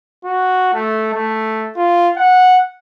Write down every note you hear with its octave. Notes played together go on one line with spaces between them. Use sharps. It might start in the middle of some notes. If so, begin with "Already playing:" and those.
F#4
A3
A3
F4
F#5